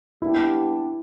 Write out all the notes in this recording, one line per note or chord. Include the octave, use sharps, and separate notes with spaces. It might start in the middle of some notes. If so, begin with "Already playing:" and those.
G3 B3 D4 E4 G4